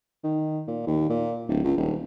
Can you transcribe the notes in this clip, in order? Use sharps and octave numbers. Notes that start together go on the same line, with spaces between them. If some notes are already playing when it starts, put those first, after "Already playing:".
D#3
A#2
D#2
A#2
D1
C#2
D#1